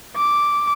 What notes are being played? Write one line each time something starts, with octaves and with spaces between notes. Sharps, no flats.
D6